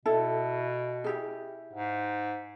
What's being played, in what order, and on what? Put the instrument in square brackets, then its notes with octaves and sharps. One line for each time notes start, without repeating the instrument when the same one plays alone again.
[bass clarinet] B2 [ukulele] E4 A4
[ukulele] E4 G4 G#4
[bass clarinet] G#2